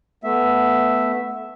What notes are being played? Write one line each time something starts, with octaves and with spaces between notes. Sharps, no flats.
A3 B3 E5